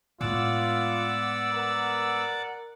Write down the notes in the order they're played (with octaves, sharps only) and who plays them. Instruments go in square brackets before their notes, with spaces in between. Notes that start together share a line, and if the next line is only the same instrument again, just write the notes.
[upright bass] A2 G#3 [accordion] B3 E6 [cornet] F4 [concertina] D5 F#5 D6
[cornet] A#4